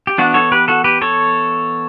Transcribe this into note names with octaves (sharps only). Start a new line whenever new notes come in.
G4
E3 B3 D4 F#4
A4 C#5
G4 B4
F#4 A4
G4 B4
A4 C#5